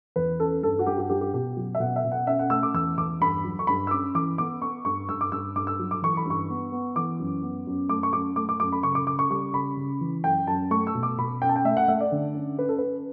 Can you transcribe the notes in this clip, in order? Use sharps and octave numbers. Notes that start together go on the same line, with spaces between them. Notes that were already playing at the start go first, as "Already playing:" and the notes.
E2 B4
C#4 A4
G2 A4
F#4
G2 G4
F#4
G2 G4
G4
B2 G4
F#3
E5
B2 F#5
E5
B2
F#5
C#4 E5
F#5
A3 E6
D6
E2 E6
E2 D6
G2 B5
F#3
C#6
G2 B5
E6
C#4 D6
E3 D6
B3 D6
B3 C#6
G2 C#6
G2 E6
D6
G2 E6
G2 D6
E6
F#3
D6
E3 C#6
B5
G2 C#6
B3
B3
E3 D6
F#2
B3
F#2
A3 D6
C#6
F#2 D6
A3 D6
D6
F#2 D6
B5
C#3 C#6
D6
C#3 D6
C#6
G3 C#6
C#3 B5
C#3
E3
F#2 G5
F#2 A5
A3 C#6
E6
B2
D6
B2 B5
C#4 G5
A5
G5
A3 E5
F#5
A3 E5
D5
D3
C#4
C#4 B4
A4
C#4 B4